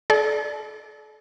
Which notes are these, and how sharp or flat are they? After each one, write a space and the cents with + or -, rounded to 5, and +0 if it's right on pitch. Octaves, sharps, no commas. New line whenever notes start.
A4 -40 D5 +0